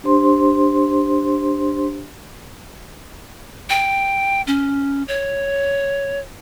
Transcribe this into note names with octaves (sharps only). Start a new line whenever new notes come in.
D4 G4 C5 C6
G5
C#4
C#5